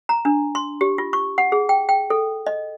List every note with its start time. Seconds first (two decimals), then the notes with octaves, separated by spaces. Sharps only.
0.09 A#5
0.25 D4
0.55 C6
0.81 G4
0.98 F4
1.13 C#6
1.38 F#5
1.52 G#4
1.69 G5
1.89 G5
2.10 A4
2.47 D#5